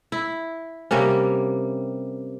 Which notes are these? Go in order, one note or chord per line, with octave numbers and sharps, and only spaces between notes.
E4
C3 G3 A#3 C#4